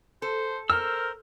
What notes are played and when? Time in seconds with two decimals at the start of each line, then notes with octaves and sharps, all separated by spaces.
0.22 A4 C5
0.70 A#4 C5 E6 F6